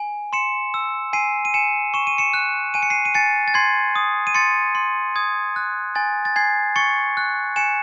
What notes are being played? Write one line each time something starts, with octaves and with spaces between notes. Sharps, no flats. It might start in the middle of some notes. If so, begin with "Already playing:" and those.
Already playing: G#5
C6 C#7 E7
E6
G#5 C7 D#7
D#7
G#5 C#7 E7
C#6 E7
D#7
C#7 E7
F#6
G#5 D#7
C#7
C7 D#7
D#7
G#5 A6 C#7
A6
C6 G#6 C7
D#6
D#7
C6 A6 C#7
C6
D#6 G#6
F#6
G#5 A6
A6
G#5 G#6 C7
C#6 A6 C#7
F#6
G#5 C#7 E7